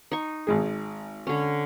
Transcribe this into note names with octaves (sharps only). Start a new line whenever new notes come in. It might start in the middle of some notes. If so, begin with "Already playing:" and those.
D#4 C#6
G#1 G#3 G#4
D3 C#4